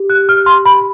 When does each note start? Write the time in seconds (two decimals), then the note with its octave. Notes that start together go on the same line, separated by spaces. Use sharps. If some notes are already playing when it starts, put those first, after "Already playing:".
Already playing: G4
0.10 F#6
0.29 F6
0.46 C6
0.66 B5